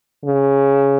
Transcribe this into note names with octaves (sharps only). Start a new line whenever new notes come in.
C#3